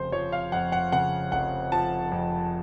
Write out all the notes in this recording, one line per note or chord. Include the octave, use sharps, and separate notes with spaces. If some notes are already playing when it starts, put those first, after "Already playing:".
Already playing: F1 C#3 C5
F3 C#5
F5
F2 F#5
F#5
C#3 F#5
F1 F#5
F3 A5
F2